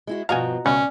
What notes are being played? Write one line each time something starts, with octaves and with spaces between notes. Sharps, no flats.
G#3 E4 F#4
G2 B2 F3 F#4 D#5 F5 G#5 A#5
C#2 B2 C#4 D5 F#5